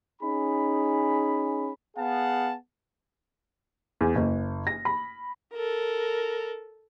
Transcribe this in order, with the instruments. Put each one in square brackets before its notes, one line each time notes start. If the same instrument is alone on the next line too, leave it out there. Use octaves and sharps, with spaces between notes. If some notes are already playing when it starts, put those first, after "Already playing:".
[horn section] C#4 D#4 G#4 B5
[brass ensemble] B3 G#4 F5 F#5 A5
[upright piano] E2
F#1
A#6
B5
[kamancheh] A4 A#4